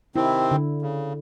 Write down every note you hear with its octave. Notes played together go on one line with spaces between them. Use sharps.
C3 D#3 C4 E4
D3
C#3